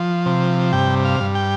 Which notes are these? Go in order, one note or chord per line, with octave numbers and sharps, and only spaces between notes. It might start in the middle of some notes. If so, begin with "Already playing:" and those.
Already playing: F3
C3
G2 G5
F5
G2
G5